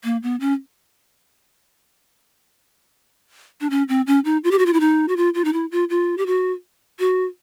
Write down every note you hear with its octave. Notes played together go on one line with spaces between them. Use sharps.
A#3
B3
C#4
D4
C#4
C4
C#4
D#4
F4
G4
F#4
F4
E4
D#4
F#4
F4
F4
D#4
E4
F4
F4
G4
F#4
F#4